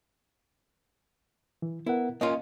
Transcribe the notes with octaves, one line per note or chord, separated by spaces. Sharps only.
E3
B3 E4 A#4 F#5
A#3 C#4 F4 D#5